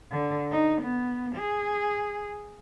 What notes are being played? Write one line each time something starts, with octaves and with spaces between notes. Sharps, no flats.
D3
D#4
B3
G#4